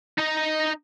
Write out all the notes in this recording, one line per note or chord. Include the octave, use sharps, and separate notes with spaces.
D#4 D#5